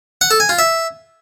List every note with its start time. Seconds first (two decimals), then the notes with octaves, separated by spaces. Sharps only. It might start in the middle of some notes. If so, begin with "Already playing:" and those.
0.21 F#5
0.31 A4
0.40 G#5
0.49 F4
0.59 E5